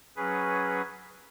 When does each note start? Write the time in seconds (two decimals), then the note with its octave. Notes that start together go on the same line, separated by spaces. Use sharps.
0.16 F#3 C#4 G#4 B4